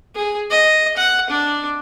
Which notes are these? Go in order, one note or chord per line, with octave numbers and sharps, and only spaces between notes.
G#4
D#5
F#5
D4